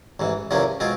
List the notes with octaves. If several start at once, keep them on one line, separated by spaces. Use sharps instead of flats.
A1 G#2 E3
E2 C3 F3 A#3 C#4
B2 G#3 C4 F4